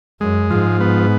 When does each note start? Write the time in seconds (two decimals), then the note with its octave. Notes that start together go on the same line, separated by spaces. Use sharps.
0.21 F#2 G#3
0.50 G#2 F3
0.81 B3